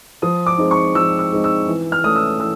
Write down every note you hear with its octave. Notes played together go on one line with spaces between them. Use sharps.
F3 D#6
D6
G#3 C4 D#4
C#6
F3 E6
E6
G#3 C4 D#4
E6
E3
F6
A3 C#4 D#6
E6
E3 E6